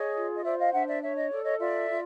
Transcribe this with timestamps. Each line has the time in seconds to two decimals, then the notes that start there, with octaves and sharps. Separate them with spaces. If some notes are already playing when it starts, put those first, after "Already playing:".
Already playing: G#4 C#5 D#5
0.16 F4
0.35 D#5
0.44 C5 D5 E5
0.58 D#5 F5
0.73 D4 E5 F#5
0.88 D5 E5
1.02 C#5 E5
1.16 D#5
1.30 A4 D5
1.44 C#5 D#5
1.60 F4 D5 E5
1.89 F4